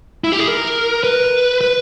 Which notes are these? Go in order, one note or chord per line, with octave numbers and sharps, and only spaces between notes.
E4
G4
G#4
A#4
B4
B4